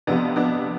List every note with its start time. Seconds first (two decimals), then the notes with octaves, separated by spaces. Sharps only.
0.07 F2 C3 F3 B3 D4
0.36 B3 D4